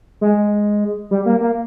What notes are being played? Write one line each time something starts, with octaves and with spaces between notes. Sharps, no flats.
G#3
G3
A#3
A#3